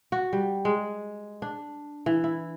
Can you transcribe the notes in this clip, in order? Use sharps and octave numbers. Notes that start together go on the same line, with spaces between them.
F#4
G3
G#3
D4
E3
E4